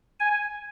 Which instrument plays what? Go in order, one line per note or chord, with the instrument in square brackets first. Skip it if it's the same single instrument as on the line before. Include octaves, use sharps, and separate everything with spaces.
[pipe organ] G#5